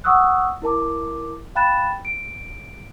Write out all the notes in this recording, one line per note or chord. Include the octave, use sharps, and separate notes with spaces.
F#5 C#6 D#6 E6 F#6
E4 A#4 A5 D6
F5 G5 B5 F#6 A6 E7
D7